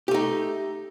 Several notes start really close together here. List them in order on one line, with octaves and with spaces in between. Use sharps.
G4 A3 D#4